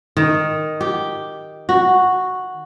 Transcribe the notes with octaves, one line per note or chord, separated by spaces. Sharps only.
D#3
G4
F#4